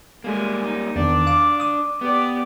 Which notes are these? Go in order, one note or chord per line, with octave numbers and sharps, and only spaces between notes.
G3 G#3 A#3 G#5
D#4
E2 D#3 D4 D5
F5 D6
D6 D#6
B3 G4 D5